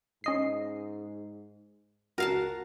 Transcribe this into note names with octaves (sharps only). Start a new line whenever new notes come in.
G#2 C#4 D#5 C7
C#2 F#4 A#4 F5 A5